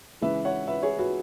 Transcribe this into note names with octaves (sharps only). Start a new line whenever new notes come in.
C#3 E3 G#3 B4 E5
C#5 F#5
B4 E5
G#4 C#5
F#4 B4